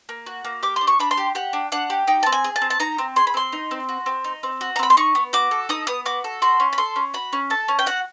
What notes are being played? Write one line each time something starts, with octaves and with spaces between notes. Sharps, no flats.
A#3
F#4
A#3
G4 D6
C6
D4
C#6
D4 B5
C6
G4
G4 F#5
D4
D4 F#5
G4
D#4 G5
C4 A5
G#5
G#4
A5
C4
A5
D#4 A#5
C4
G#4 C6
B5
C4 C6
D#4
C4
F#4
C4
D#4
C4
F#4
A#5
C4 B5
C6
D#4 C#6
B3
F#4 D6
A4
D#4 D#6
B3 D#6
F#4 D6
A4
F#4 C6
C#4
B5
A4 C6
C#4
F#4 B5
C#4
A4 A5
C#4
G5
F#4 F#5